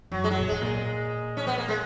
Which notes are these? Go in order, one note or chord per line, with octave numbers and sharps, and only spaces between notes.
F#2 F#3
G#3
F#3
A#2
G#2 G#3
A#2
C#4
B3
A#3
G#3